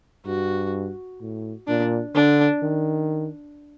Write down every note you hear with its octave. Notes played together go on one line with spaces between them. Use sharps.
G2 F#4
A2
A#2 D4
D3 D4
D#3